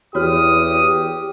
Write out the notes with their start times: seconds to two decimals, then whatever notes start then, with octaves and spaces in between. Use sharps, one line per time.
0.15 E2 F#4 G4 C#5 D#6 F6